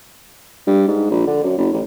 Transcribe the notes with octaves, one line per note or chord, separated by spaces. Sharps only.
G2
G#2
A#1
D3
F#2
F#1
A1